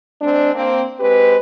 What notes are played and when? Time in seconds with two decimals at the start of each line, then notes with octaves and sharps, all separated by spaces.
0.21 G#3 C4 D4
0.54 A#3 C4
0.99 G#3 C4 G4 B4